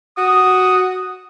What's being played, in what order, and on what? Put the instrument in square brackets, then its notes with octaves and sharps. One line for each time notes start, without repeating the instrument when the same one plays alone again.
[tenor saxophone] F#4 [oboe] D#6